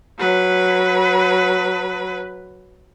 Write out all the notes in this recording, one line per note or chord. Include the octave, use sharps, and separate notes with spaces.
F#3 B4